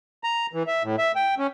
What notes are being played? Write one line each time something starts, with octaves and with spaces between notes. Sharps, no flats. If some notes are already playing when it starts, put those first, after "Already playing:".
A#5
E3
E5
A2
E5
G5
C#4